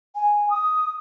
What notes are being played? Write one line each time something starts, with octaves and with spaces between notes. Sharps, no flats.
G#5
D#6